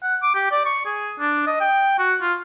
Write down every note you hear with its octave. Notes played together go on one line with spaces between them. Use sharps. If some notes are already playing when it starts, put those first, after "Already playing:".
F#5
D6
G4
D5
C#6
G#4
D4
D#5
G5
F#4
F4